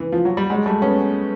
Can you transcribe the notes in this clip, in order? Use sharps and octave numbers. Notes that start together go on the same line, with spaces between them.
E3
F3
F#3
G3
F#3 G#3
G3 A3
B3 C#4